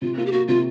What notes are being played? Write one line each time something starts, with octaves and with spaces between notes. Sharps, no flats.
C3 F4
A#3 F4
G4
A#3 F#4
C3 F4